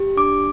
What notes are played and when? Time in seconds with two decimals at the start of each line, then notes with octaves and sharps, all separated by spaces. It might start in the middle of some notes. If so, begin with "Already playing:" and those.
Already playing: G4
0.17 D4 D6